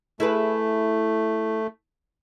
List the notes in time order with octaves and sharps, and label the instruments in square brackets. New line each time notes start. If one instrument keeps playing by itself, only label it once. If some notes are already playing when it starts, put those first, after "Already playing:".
[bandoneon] A3 [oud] E4 G#4 B4